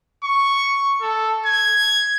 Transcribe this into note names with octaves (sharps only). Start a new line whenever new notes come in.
C#6
A4
G#6